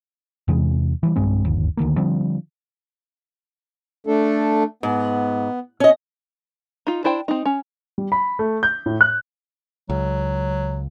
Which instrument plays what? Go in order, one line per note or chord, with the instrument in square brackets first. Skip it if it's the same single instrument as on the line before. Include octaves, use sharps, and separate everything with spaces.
[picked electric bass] E2 C3 E3 G#3
E3 F#3 G3
B1 G2 G#3 C4
D1 G1 D#2
D2 D#3 A3 A#3
D3 F3 G3 C4
[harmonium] A3 D4 A4
[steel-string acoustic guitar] G#2 [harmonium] B3
[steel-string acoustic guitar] C#4 D#5
[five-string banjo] D#4 F4
D4 E4 C5 G5
C4 D#4
C#4
[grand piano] G3
B5
A3
G6
A2
F#6
[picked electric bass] C#2 [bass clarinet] F#3